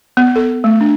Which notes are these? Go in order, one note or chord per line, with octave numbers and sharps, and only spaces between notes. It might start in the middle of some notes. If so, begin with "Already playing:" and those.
B3
A4
A3
D4